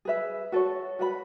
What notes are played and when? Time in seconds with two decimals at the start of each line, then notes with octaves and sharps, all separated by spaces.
0.05 G#4 B4 E5
0.52 F#4 A4 C#5
0.99 F#4 B4 F#5 B5